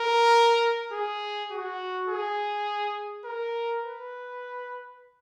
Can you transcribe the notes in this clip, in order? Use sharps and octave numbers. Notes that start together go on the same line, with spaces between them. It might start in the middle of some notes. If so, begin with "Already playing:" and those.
Already playing: A#4
G#4
F#4
G#4
A#4
B4